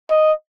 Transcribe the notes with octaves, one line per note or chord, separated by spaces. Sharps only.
D#5